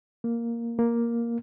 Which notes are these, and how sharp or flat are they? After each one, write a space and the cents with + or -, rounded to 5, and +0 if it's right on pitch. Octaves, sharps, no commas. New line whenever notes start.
A#3 +0
A#3 +5